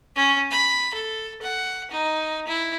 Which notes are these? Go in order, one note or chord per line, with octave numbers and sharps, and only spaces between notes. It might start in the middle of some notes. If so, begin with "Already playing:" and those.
C#4
B5
A4
F#5
D#4
E4